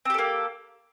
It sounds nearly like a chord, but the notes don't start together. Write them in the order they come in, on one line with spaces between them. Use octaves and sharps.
C4 G4 A4 A#3